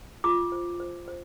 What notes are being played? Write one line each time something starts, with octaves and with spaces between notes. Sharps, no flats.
F4 D6
C5
C5
C5